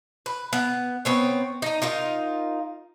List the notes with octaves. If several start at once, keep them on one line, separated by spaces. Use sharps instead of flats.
B4
B3
B3 C4 C#5
D#4 A#5
D#4 F4 A#4